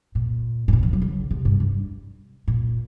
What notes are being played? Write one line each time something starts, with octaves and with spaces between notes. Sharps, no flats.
A#2
A2
A#2
E3
F#3
C#3
C3
G2
G2
A#2